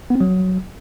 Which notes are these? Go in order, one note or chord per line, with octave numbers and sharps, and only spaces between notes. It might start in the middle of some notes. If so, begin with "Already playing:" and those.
B3
C4
F#3